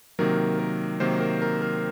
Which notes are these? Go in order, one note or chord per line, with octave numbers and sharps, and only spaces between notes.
C3 D#3 F#3 A#3 A#4
A#4
C3 D#3 F#3 A#3 C5
A#4
A#4
A#4